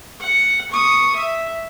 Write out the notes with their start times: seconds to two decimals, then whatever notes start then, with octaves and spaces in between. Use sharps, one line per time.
0.20 F#5
0.71 C#6 D#6
1.16 E5